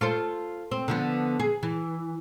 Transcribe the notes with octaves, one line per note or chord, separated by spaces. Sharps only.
F4 A4 C5
C4
D3 F3 B3
G#4
E3